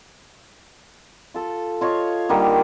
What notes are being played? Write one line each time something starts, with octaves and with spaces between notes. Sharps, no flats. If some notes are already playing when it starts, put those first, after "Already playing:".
F4 A4
F4 C#5 D#5 F5
D3 D#3 G3 A#3